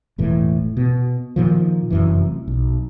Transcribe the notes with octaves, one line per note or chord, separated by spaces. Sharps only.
E1 A2 E3
B2
A#2 D#3 F3
F1 F#2 E3
B1